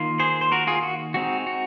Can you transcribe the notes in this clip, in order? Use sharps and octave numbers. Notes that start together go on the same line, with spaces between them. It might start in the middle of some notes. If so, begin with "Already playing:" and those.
Already playing: D#3 A#3 F4
G#4 C5
C5
F#4 A#4
F4 G#4
F#4
G#3 C4 D#4 F#4
F#4